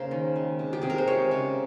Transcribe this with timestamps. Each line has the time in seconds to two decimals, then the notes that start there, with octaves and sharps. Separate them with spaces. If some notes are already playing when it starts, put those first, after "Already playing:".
Already playing: C#3 A#3 A#4 C5
0.11 D#3
0.36 G#3
0.59 C3
0.73 G4
0.81 C3 G#4
0.90 A#4
0.98 C5
1.07 G#3 C#5
1.31 C#3